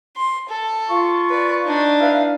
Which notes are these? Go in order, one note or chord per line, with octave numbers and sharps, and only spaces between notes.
C6
A4
F4 C#6
B4 D5
D4 D#4
E4 B4 F5